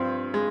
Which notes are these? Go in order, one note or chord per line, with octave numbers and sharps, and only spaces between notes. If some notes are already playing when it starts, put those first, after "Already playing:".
Already playing: G2 F3 C4
G#3